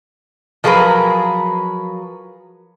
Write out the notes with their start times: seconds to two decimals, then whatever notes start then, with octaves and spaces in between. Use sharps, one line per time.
0.64 F3 F#3 G#4 A#4 B4